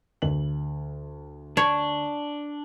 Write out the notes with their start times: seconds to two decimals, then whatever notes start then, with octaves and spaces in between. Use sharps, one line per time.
0.22 D2 F#7
1.57 D4 C#5